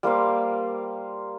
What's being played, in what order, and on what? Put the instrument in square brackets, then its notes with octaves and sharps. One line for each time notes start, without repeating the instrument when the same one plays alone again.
[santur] G3 A#3 C5 F5